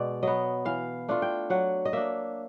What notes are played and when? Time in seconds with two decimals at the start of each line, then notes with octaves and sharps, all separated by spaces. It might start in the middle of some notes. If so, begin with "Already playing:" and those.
Already playing: B2 G#3 D5
0.23 F#3 B3 D#5
0.65 E3 F5
1.09 A3 D4 F4
1.22 G5
1.50 F#3 F#5
1.85 D#5
1.93 A#3 D4 E5